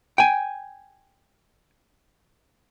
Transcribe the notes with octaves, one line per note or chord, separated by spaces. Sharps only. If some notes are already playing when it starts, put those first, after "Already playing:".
G5 G#5